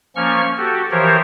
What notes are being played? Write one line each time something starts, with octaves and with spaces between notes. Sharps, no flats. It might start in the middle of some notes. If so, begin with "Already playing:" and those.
F3 A#3 C#4 C#6 F6
F#4 G4 A4
E3 F3 G4 A#4 C5 C#5